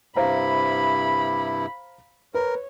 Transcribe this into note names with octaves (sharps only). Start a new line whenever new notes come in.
G2 C3 E4 C5 F5 A#5 B5
A#4 B4 C#5